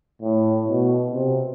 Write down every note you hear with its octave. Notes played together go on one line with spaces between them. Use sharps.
A2
B2
C3